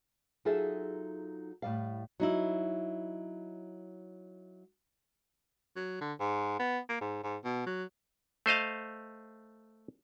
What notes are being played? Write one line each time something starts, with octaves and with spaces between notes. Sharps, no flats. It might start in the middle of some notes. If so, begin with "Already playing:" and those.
F#3 D#4 F4 G#4 A4 E5
A2 G3 F5
F#3 D#4 E4
F#3
D3
G#2
B3
A#3
G#2
G#2
B2
F#3
A3 C5 D#5 F5